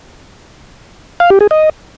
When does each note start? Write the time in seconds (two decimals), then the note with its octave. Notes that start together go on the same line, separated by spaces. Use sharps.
1.20 F5
1.30 G4
1.41 G#4
1.51 D#5